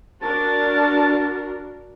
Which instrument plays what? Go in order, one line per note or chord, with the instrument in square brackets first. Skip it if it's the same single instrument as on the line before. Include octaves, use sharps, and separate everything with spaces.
[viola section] D4 F#4 A#4 [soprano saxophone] A5